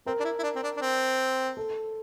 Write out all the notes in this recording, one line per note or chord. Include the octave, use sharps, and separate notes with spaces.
C4 A#4
D4
E4
E4
D4
C4
D4
D4
C4
A4